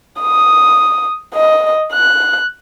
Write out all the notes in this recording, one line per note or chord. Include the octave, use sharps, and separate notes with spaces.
D#6
D#5
F#6